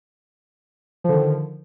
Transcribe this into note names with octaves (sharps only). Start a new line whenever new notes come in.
D3 D#3 F3